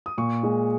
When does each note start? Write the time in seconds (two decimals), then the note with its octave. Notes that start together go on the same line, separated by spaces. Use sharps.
0.06 D#6
0.18 A#2 C#6
0.43 G#3